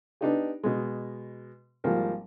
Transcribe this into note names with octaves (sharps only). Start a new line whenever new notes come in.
B3 D4 D#4 G4
B2 G#3
G#1 F3 G3 A#3 A#4